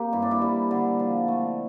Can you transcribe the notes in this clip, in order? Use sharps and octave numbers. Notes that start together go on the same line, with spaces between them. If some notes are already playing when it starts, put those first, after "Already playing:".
Already playing: A#3 C4 G4
G2 E4
D4
E4
G3
D3
F3
A3